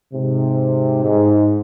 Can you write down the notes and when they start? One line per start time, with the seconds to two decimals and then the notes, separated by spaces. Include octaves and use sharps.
0.13 G#2 C3
1.04 G#2